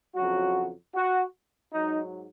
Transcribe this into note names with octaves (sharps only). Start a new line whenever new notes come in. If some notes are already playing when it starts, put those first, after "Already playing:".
F2 C#3 F#3 F#4
F#4
G#2 F#3 D#4